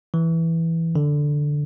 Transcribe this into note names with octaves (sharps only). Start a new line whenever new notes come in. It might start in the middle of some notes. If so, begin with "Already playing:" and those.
E3
D3